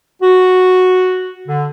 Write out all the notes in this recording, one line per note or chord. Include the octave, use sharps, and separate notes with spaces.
F#4
D3